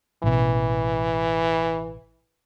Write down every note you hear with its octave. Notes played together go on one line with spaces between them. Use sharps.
A1 B2 E3